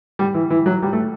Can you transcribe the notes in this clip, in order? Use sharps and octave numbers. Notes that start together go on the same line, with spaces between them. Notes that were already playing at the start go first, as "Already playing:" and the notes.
G3
E3
E3
F#3
G3
A3